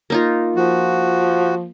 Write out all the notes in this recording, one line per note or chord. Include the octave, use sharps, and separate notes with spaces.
A#3 D#4 F4
F3 F#4